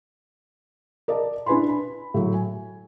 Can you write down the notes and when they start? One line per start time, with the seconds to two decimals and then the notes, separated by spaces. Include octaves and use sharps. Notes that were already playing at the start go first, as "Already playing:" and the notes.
1.08 A#4 D5 D#5 A5
1.46 D4 E4 B4 G#5 B5 C6
1.69 B5
2.14 A2 F#3
2.34 G#5